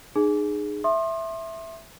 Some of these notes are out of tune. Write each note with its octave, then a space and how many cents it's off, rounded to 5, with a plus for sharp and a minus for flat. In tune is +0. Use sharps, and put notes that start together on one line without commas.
D#4 -40 G#4 +0
E5 +0 C6 +30 D#6 -35